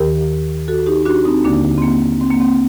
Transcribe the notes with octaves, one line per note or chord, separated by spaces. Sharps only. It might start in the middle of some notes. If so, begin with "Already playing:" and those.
Already playing: D#2 D#3 G4 A#4
F#4 A4
D#4 G4
D4 F#4
C4 D#4
D#2 D3 A#3 D4
C4
A#3
C4
A#3
C4